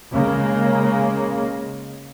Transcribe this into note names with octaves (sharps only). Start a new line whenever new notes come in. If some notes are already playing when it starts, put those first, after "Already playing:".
C#3 G#3 A#3